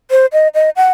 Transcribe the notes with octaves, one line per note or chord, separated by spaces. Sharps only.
C5
D#5
D#5
F#5